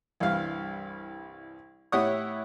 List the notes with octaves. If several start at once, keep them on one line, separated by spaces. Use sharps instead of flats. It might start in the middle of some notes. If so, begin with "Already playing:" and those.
C2 G2 E3 F5
A2 E4 G4 C#5 F#5 D#6